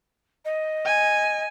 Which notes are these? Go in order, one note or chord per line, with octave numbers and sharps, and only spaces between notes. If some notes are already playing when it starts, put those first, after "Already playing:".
D#5
G#5